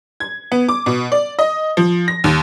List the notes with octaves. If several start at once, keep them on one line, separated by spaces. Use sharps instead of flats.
G#6
B3
D6
B2
D5
D#5
F3
A#6
D#2